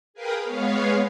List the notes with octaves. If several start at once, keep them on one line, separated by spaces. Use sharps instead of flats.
G#4 A#4 B4 F5 G5 D#6
G#3 B3 C#5 F5